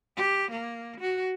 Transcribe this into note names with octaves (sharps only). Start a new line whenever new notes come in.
G4
A#3
F#4